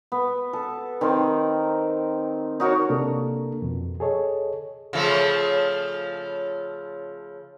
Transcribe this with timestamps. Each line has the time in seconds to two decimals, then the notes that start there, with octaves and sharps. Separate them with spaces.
0.12 B3
0.53 A4
1.01 D#3 C4 A#4
2.60 D#4 F#4 A#4 C#5
2.89 C3 A#3 D4 A4 A#4
3.62 F2 B2
4.00 G#4 A4 C#5 D#5
4.93 C#3 F3 A3